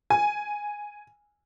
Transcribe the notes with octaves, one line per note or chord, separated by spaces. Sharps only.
G#5